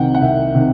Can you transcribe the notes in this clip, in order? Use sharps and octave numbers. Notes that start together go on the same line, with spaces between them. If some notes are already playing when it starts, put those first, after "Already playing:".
Already playing: C2 C3 D#3 F#5 G5
F#5
C2 E5
C3 D#3